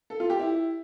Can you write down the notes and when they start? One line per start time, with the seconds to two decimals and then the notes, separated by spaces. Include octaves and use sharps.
0.10 A4
0.20 F4
0.30 G4
0.40 E4